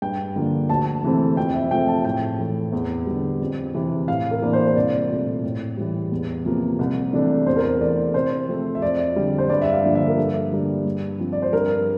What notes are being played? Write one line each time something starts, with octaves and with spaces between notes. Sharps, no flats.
G2 G5
D3 F3 A#3
D2 A5
C3 E3 A3 C4
F2 G5
E5
C3 F3 A3 G5
A5
A2 G5
E3 A3 C4
E2
D3 G3
F2
C3 E3
A2 F5
A#4
E3 A#3 D4
C5
C5
C2 D5
A#2 A3
A2
E3 G3
E2
C3 F3 A#3
C2
C3 E3 A3 D4
E2 C5
A#4
C5
E3 A3 D5
C3 C5
F3 A3 C4
E5
F2 D5
D3 G3
C5
G2 D5
E5
F5
D3 F3 A#3 D4
E5
A#4
G2 A4
D3 G3 A#3 D4
G2
F3 C4
D5
C5
G2 A#4